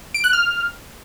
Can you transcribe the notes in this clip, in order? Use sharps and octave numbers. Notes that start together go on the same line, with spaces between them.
D7
F#6
F6